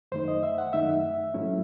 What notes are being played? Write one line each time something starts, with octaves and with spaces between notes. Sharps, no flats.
F#2 D#3 A3 D#4 C5
D#5
E5
F#5
F#2 D#3 A3 D#4 E5
G#2 F#3 A3 C#4 E4